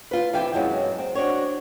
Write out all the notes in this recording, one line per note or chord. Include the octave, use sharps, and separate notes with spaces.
F4 B4
C3 E3 F5 G5
F#2 B2 D#3 F#3 G#3 B3
C4
D4 F#4 C5 C#5